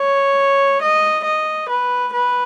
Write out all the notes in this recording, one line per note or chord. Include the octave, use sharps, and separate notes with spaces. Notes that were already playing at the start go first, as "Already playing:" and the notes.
Already playing: C#5
D#5
D#5
B4
B4